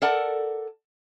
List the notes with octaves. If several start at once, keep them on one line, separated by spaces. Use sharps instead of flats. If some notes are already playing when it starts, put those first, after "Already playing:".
A4 A#4 D5 F#5 A5